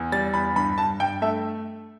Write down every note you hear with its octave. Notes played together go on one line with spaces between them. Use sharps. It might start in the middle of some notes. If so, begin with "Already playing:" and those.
Already playing: E2
G3 A6
E2 B5
G2 B5
G2 A5
G2 G5
A3 E5